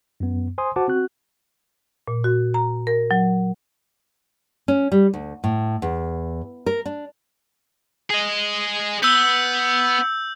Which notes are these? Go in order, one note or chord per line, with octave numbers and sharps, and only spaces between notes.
F#2 B3
C5 G#5 C6 D#6
F#4 C5 F#5 A5 D6
C4 F#4 F#6
A#2
F#4
A#5
A#4
F#3
C#4
G3
D2
A2
E2
A#4
D4
G#4 D#5
B3 E6 G6